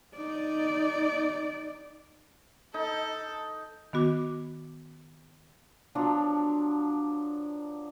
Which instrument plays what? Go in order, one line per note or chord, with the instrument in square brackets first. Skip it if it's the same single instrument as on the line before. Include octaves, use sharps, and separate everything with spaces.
[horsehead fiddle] D#4 D5
[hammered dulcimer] D#4 [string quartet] A4
[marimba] D#3 B3 F#4 D6
[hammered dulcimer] F3 F#3 B3 D4